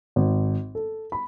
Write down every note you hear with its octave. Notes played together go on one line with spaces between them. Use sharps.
G#1
A4
B5